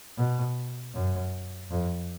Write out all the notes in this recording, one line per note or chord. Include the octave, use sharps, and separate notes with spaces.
B2
F#2
F2